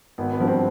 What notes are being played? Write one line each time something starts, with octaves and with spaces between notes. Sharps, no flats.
G#1 B3
B3
G2 F3
C4